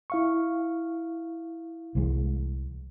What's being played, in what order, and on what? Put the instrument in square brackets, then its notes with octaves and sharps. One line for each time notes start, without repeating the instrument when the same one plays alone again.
[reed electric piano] E4 F5 C#6
[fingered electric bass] C2 E3 G#3